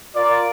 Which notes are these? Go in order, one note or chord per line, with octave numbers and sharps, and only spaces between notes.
F4 A#4 D5